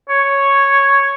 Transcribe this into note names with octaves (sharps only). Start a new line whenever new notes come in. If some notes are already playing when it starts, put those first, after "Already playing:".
C#5